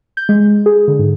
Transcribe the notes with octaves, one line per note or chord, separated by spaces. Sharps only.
G6
G#3
G#4
D3
G#2